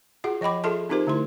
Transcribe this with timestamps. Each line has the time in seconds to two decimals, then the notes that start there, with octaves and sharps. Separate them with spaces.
0.24 F4 F#4 G#4 F#5
0.41 F3 D#5 G5 B5 D6
0.64 F4 G#4 A4 E5 A5 C6
0.89 C4 D#4 F4 G4 A#4 C5
1.07 D3 A3 E4 C6